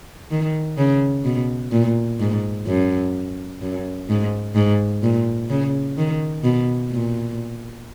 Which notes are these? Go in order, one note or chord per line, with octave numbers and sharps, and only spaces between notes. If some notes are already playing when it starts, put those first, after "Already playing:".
D#3
C#3
B2
A#2
G#2
F#2
F#2
G#2
G#2
A#2
C#3
D#3
B2
A#2